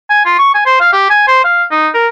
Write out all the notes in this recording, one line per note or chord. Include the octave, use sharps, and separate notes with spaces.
G#5
F4
C#6
G#5
C5
F5
G4
G#5
C5
F5
D#4
A#4